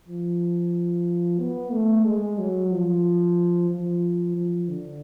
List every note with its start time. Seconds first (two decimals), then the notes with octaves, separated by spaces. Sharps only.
0.08 F3
1.39 B3
1.72 A3
2.05 G#3
2.38 F#3
2.71 F3
3.70 F3
4.36 F3
4.69 D3